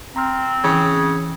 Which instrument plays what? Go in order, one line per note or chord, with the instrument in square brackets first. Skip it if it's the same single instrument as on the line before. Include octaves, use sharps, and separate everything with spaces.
[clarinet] C4 [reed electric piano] A#5 C6 F6
[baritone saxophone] C#3 [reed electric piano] E3